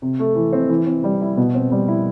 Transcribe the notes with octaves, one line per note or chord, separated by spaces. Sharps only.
C3
A3
E3
C4
E3
C4
G3
E4
B2
C4
G3
E4